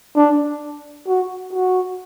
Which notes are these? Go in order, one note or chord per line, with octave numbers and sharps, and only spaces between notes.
D4
F#4
F#4